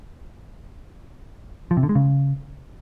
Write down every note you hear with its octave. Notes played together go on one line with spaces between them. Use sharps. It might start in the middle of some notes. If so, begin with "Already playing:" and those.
F3
C3
D3
G#3
C#3